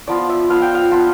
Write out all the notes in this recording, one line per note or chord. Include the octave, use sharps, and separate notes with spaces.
F3 B3 F4 D5
E5
F3 B3 F4 F5
G5
F5
F3 B3 F4